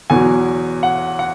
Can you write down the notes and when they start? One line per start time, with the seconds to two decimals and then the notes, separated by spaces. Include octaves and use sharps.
0.10 E2 B2 F#3 G#5
0.83 F#5
1.19 F#5